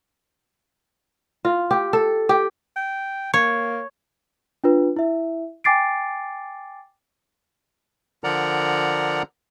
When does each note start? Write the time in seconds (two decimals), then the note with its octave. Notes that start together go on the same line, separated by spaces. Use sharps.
1.45 F4
1.71 G4
1.93 A4
2.29 G4
2.76 G5
3.34 A#3 C#5
4.64 D4 F4 B4
4.96 E4 E5
5.64 G5 G#5 D6 A6 C7 D7
8.24 D3 F3 A#4 D5 F#5 A#5